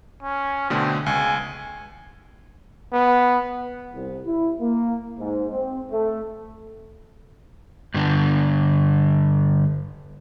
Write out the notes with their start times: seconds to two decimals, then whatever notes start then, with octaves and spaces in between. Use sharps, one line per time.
0.23 C#4
0.70 B2 D3 A3 C4
1.06 C#2 G#5
2.93 B3
3.93 C2
4.26 E4
4.60 A#3
5.19 G#2
5.52 C4
5.90 A3
7.94 G2 D3